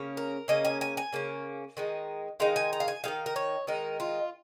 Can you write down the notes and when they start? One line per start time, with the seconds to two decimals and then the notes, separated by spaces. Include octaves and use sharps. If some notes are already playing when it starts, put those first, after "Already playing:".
Already playing: C#3 A#3 C#4
0.17 A#4
0.48 C#3 A#3 C#4 D#5
0.65 G#5
0.81 G#5
0.97 G#5
1.13 C#3 A#3 C#4
1.77 D#3 G#3 D#4
2.40 D#3 G#3 D#4 F5
2.56 G#5
2.73 A#5
2.80 F5
2.88 G#5
3.04 D#3 G#3 D#4 F5
3.26 A#4
3.36 C#5
3.67 D#3 G#3 D#4 A#4
4.00 F4